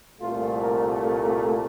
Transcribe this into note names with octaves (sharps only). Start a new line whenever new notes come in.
C2 A#2 A3 F4
A#4
A#4